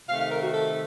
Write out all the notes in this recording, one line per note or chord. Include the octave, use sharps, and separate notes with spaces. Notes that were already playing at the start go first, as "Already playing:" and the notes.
C3 D#3 A3 F5
F5
A#4
F#4
A4